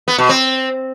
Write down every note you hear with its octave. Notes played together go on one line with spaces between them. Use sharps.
B3
B2
C4